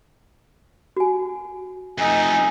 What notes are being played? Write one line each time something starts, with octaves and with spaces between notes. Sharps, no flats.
F#4 G#5
F2 A3 D#4 G#5